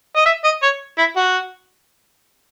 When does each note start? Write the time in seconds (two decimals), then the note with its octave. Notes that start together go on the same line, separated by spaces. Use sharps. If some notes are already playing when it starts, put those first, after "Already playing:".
0.16 D#5
0.25 E5
0.44 D#5
0.62 C#5
0.98 E4
1.16 F#4